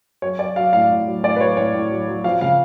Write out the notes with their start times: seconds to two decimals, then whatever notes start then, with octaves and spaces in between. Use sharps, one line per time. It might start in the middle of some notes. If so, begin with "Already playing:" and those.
0.22 F#3 C#5
0.39 F#3 D5
0.56 F#3 F5
0.73 A2 F5
0.90 A2
1.07 F#3
1.23 A2 D5
1.36 B4
1.40 F#3 C#5
1.57 A2 C#5
1.74 A2
1.91 F#3
2.08 F#3
2.24 F3 F5
2.41 C#3 F5